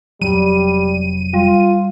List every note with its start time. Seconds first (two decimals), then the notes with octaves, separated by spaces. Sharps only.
0.22 F1 D#2 F#3 G3 D#7
1.34 G3 F4